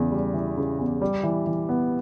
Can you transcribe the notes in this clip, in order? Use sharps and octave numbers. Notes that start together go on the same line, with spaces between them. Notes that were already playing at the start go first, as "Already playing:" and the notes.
Already playing: E2 C#3
G3
E3
C#3
E2
G3
E3
E3
B3